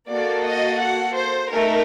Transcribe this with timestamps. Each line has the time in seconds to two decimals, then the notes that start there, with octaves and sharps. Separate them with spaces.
0.08 A#3 F#4 A4 D5
0.45 D#5
0.80 F#5
1.15 C5
1.51 A3 D#4 A#4